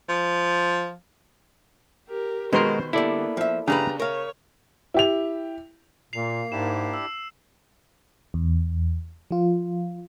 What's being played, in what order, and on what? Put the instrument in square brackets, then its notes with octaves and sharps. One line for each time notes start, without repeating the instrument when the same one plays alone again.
[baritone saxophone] F3
[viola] G4 A#4
[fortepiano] B2 C6 [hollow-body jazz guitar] D#3 [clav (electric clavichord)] G#3 F#4 A#4 [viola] C5
[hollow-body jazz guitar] D3 G3 [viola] A#3 B3 [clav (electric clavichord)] E4 A4 D5
[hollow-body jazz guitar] F3 E5
[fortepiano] C#3 [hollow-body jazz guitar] D4 G4 B4 [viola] A#5
[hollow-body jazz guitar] A#4 F5 [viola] C#5
[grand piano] E4 G4 F7
[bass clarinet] A#2 [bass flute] A#3 [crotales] C7 F7
[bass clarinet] G#2 [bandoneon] D4 E4 G4 [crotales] E7
[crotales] E6
[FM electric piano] E2
F3 F4